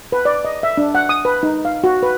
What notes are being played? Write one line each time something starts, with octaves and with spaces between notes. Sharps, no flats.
B4
D5
D#5
E5
D4
F#5
D#6
B4
D#4
F5
F#4
B4